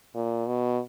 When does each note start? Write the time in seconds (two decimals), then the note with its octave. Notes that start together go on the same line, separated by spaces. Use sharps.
0.15 A#2
0.47 B2